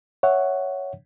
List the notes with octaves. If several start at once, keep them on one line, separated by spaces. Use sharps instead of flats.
C#5 E5 F#5